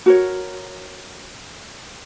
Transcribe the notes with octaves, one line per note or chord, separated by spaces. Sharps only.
F#4 A#4 C#5